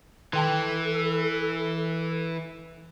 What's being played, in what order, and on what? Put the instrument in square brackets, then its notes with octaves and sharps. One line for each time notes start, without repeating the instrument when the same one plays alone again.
[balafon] D#3 G5 A5 [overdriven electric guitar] E3 [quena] A4